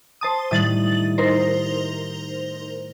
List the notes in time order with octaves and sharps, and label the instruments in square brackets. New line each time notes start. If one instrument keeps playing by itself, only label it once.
[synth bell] C5 A5 D#6
[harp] A2 D#3 G3 [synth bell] D#6 A6 F#7
[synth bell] D#4 A#4 C5